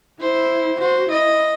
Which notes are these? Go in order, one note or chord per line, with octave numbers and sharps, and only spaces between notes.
E4 C5
F#4 C5
E4 D#5